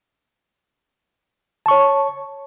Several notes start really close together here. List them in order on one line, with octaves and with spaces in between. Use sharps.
A5 C#6 C#5